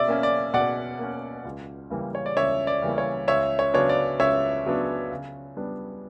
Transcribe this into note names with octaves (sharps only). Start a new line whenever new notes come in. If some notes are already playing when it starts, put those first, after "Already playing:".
Already playing: B2 D5 E5
A#3 C#4
D5
B2 D5 F#5
A#3 C#4
C#2
C#3 E3 G3 A#3
C#5
D5
C#2 C#5 E5
D5
C#3 E3 G3 A#3
C#5
C#2 C#5 E5
C#5
C#3 F#3 B3 D4 C#5
D5
C#2 C#5 E5
C#3 F#3 B3 D4
C#3
G3 B3 D4